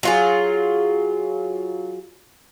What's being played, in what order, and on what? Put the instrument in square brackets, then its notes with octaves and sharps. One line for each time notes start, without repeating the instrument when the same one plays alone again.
[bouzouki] F#3 F4 G#4